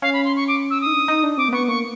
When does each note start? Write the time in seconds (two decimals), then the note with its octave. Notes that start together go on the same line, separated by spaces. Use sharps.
0.02 C#4 F5
0.13 B5
0.25 C6
0.36 C#6
0.48 D6
0.70 E6
0.81 D#6
0.86 D#4
0.93 D4
1.08 D#4
1.23 D4
1.38 C4 D6
1.49 A#3
1.53 B3 C#6
1.68 A#3 C#6